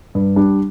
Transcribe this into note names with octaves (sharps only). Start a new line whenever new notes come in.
G2
G3 D4